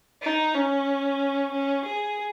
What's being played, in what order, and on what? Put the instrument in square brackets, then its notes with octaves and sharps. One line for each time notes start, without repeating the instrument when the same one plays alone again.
[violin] D#4
C#4
C#4
G#4